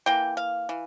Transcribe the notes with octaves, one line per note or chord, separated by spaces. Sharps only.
E3 A#3 G5
F5
E3